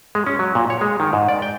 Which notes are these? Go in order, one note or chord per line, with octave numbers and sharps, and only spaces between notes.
G#3
C#4
F#3
A#2
C#5
G#3
D#3
G#2
D5
G5